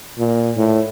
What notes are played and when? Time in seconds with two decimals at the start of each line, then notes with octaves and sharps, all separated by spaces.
0.18 A#2
0.57 A2